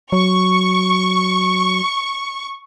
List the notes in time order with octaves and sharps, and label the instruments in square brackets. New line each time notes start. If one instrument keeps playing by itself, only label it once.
[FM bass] F#3 [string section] C#6